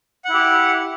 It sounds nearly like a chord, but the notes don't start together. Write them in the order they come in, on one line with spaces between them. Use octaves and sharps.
F#5 E4 G4